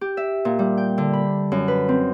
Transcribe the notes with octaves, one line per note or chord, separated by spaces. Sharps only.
G4
E5
A#2
G3
G5
D3
B5
F#2
B4
C4